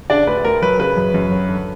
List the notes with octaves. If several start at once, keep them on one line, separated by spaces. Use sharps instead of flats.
C#3 D4 D5
D2 B4
D2 A#4
F#3 B4
C#3 B4
F#2
F#2
F#3
D3